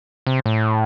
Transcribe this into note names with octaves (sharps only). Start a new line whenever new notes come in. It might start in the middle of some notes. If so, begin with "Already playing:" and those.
C3
A2